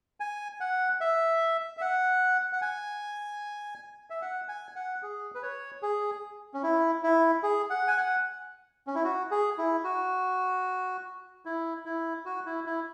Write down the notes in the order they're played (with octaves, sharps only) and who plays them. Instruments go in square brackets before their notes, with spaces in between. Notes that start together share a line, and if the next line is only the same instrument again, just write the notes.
[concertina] G#5
F#5
E5
E5
F#5
F#5
G#5
E5
F#5
G#5
F#5
G#4
B4
C#5
G#4
C#4
E4
E4
G#4
F#5
G#5
F#5
C#4
E4
F#4
G#4
E4
F#4
E4
E4
F#4
E4
E4